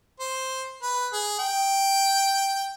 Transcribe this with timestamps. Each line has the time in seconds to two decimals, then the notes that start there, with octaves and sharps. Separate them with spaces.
0.20 C5
0.82 B4
1.13 G#4
1.39 G5